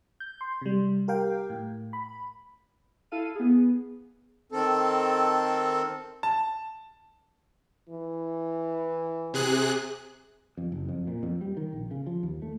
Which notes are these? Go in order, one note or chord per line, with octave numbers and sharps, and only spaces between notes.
G6
C6
C3 G3
G4 A#4 F5 G5
A2
B5
E4 A4 F5 D#7
B3 G#4
D#3 C4 A4
A5
E3
C3 G#4 F#6
F2
F#1
F2
A#2
F2
G3
D#3
A#1
C#3
F3
D#2
A3